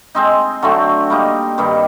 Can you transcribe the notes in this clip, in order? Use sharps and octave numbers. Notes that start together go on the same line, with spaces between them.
G#3 C4 D#4
D3 F#3 A3 C4
G3 A#3 D#4
G2 D#3 G3